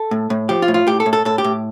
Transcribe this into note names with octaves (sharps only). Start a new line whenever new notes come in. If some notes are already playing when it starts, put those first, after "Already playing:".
Already playing: A4
A2
A2
F3 G4
F4
A2
F4
A2 G4
A4
A2
A4
A2 A4
G4
A2